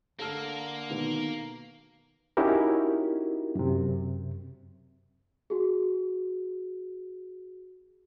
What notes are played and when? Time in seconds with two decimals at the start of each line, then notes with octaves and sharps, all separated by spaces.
0.19 D3 A#3 A4 A5 F6
0.90 B2 D#3
2.37 C#4 D#4 E4 F#4 G4 A#4
3.55 F#2 C3
5.50 F#4 G#4